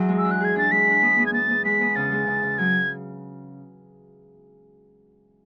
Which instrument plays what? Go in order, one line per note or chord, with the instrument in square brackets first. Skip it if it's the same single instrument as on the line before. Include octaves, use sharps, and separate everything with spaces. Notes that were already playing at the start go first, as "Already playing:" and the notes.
Already playing: [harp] E2 F#3
G#3
[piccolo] E6
[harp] D4
[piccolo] F#6
[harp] G#4 [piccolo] G#6
[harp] D4 [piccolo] A6
[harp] G#3 [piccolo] B6
[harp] D4
B3
B3
[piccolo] G#6
[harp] B3 [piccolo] A6
[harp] B3
[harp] G#3 [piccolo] B6
[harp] B3
[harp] C#3 [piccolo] A6
[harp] G#3
C#3
C#3
[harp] F#3 [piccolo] G#6